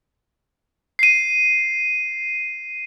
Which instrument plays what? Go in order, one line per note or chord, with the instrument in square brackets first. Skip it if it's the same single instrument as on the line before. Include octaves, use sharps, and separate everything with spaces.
[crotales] C7 D#7